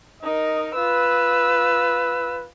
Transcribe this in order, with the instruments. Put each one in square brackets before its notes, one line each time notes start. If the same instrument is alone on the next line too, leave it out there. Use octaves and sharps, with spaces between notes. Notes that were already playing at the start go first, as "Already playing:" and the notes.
[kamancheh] D#4 A#4 [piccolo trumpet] D#5
[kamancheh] F4 E6 [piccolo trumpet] B4